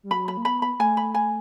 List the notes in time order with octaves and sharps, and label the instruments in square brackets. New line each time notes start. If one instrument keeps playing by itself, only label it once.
[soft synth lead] G3
[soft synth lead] F#3 [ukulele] B5
[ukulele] B5
[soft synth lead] A#3
[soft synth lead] B3 [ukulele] B5
[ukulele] B5
[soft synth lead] A3 [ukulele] G#5
[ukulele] B5
G#5